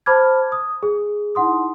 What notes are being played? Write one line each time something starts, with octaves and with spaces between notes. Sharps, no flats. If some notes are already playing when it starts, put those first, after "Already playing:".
C5 A5 B5 D6 F6 G#6
D#6
G#4
D#4 E4 F#5 C6 D#6